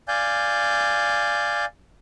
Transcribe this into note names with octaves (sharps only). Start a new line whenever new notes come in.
D5 F5 G#5 G6